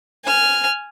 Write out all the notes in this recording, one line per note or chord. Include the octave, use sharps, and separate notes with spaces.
G#5 F6